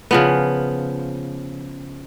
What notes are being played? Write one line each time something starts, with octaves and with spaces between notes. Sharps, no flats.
C#3 F3 B3